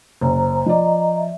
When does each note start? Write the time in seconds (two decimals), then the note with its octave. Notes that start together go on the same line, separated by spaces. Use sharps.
0.21 F#1 C5 A#5
0.66 F3 D5 D#5 A#5
1.16 E5